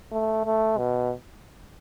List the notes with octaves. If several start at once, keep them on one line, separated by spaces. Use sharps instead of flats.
A3
A3
B2